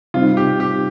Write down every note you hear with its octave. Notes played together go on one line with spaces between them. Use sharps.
C3 G3 C4 D#4 F4
G4
G4